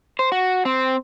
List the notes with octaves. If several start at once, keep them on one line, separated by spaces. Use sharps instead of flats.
C5
F#4
C4